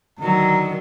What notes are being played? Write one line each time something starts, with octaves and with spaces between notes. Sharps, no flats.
D3 D#3 F#3 A#5